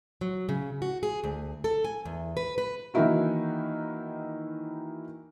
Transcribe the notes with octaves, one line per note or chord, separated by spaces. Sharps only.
F#3
C#3
F#4
G#4
D2
A4
G#5
E2
B4
B4
D#3 E3 A#3 D#4 E4 F#4